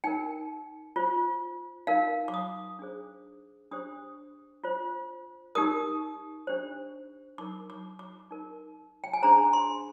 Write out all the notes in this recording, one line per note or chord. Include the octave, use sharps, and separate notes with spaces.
D#4 A#4 G5
F4 C5
D#4 A#4 F5
D6
D#6
D4 G#4 C5
D4 G4 C5 D#6
F4 C5
D#4 G4 A#4 D#6
D4 G4 C5
D#4 A#4 D6
D6
D6
D#4 A#4
G5
G#5
D4 G#4 C5 A#5
C6